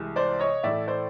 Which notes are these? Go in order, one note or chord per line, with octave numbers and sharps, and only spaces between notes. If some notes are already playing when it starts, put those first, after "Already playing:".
Already playing: C2 C3 E3 G#3
C5 D5
C#5 D#5
A2 E3 A3 D5 E5
C5 D5